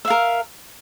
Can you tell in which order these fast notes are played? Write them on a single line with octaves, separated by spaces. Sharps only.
E5 F5 A#4